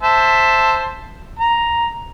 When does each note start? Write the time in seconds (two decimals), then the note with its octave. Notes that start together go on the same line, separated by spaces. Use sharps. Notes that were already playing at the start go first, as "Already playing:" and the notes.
0.03 C5 E5 A5
1.39 A#5